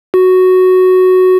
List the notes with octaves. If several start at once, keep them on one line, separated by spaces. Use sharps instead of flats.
F#4